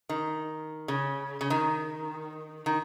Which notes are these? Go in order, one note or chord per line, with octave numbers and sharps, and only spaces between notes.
D#3
C#3
C#3
D#3
D#3